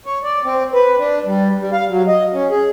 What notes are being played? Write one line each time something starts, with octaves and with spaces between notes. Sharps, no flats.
C#5
D5
C4
B4
D4
G3
G3
F5
F#3
D#5
C#4
G#4